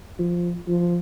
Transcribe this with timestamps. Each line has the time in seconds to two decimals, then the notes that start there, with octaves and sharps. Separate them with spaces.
0.19 F3
0.68 F3